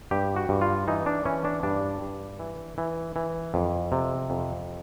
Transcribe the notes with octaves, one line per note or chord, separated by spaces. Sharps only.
G2 G4
F#4
G2
F4
E3 D#4
D4
E3 C#4
D4
G2 D4
G2
E3
E3
E3
F2
C3
F2